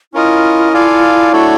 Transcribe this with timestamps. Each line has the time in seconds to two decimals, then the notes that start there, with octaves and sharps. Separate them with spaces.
0.13 C#4 E4 F4 A#4 D#5
0.73 F4 A4 D5 F5 G#5
1.32 A3 D4 F#4 A4 C#5